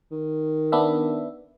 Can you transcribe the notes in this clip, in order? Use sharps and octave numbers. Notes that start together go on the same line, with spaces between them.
D#3
B3 D4 E5